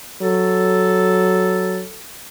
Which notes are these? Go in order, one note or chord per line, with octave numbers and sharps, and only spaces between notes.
F#3 A4